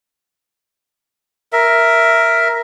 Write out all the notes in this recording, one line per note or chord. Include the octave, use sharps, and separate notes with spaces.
A#4 E5